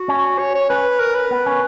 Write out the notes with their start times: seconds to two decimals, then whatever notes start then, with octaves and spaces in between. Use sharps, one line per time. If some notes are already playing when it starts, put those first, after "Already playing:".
Already playing: F#4
0.08 C#4
0.39 C#5
0.55 C#5
0.70 C#4 B4
1.00 A#4
1.15 B4
1.31 B3
1.46 C#4